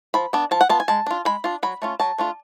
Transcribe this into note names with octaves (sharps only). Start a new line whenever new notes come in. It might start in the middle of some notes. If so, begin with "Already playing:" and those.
F3 B5
B3 D4
F3 A5
F#5
B3 F4 A5
G#5
G#3 A5
D4 F4
G#3 B5
D4 F4
F#3 B5
A3 C#4 F4
F#3 A5
A3 D4 F4